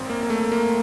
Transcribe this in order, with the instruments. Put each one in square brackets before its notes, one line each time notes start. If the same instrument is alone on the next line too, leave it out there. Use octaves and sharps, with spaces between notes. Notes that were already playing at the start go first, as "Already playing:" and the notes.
Already playing: [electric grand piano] G#1 F#2 C4
A#3
A#3
A3
A#3